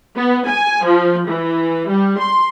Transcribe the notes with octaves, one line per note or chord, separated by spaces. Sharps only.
B3
G#5
F3
E3
G3
C6